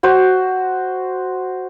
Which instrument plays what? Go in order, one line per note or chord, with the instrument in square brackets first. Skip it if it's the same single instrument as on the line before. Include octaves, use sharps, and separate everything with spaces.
[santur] F#4 C5